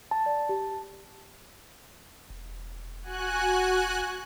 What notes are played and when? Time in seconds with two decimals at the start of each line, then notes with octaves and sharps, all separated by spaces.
0.11 A5
0.26 D5
0.49 G4
2.30 E1
3.03 F#4 G#5 F#6